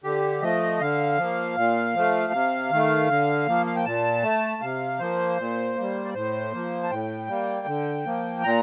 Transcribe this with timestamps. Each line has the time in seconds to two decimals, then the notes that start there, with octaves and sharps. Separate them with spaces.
0.04 D3 G4
0.42 F3 A3 D#5
0.80 D3 F5
1.18 F3 A#3
1.57 A#2
1.95 F3 A3
2.33 C3
2.71 D#3 A3
3.09 D3
3.48 F3 A#3
3.66 F5
3.76 G5
3.85 A#2 A5
4.23 A3
4.62 C3 F5
4.99 F3 A#3 C5
5.38 A#2
5.76 G3 A#3
6.05 D5
6.14 A2 C5
6.52 F3 A#3
6.83 A5
6.90 A2 G5
7.28 G3 A#3
7.67 D3
8.05 F3 A#3
8.43 A#2 A#5